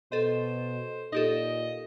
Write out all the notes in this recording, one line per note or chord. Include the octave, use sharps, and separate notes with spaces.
B2 A4 C5 D#5
A#2 D#4 G4 A4 D#5